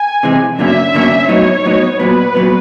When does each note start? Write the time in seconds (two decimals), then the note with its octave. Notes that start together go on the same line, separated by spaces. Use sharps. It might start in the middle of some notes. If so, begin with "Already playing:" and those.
Already playing: G#5
0.23 C3 E3 G#3
0.59 G2 D3 F#3 A#3 C#4 E5
0.94 G2 D3 F#3 A#3 C#4
1.29 A2 F#3 B3 D#4 C#5
1.65 A2 F#3 B3 D#4
2.00 A#2 F#3 B3 B4
2.35 A#2 F#3 B3